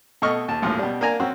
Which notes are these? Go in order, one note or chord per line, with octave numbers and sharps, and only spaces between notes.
B2 A3 A4 D#5 C#6 F6
D#2 A5
G#1 D#2 A2 F3
B2 G3
A#3 D4 G#5 A#5
C4 C#4 F#4